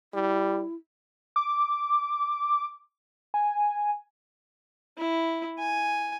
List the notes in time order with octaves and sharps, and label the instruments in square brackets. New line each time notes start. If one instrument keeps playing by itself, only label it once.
[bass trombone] G3 [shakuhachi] E4
[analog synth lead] D6
G#5
[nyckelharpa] E4
G#5